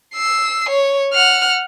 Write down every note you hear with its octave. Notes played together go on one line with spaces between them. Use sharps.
E6 C7
C#5
F#5 F6